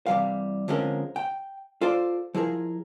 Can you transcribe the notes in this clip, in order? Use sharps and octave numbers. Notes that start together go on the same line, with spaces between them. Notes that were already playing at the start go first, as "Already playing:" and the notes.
C3 E3 G3 F5
D3 F3 G#3 C4 C#4 A#4
G5
F4 A4 C5 D5
F3 E4 G#4 A#4